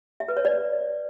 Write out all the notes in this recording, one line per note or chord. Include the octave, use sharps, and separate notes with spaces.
E5
B4
C#5
D5